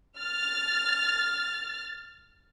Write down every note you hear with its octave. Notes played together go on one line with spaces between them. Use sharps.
F6 A6